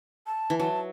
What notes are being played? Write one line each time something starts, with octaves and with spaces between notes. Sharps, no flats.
A5
E3
F#3 A5